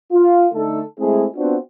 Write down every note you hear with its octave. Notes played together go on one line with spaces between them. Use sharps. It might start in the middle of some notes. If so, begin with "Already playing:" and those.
F4
D3 A3 D#4 A4
G#3 A3 C4 E4 G#4
B3 C4 D4 F4 F#4 C5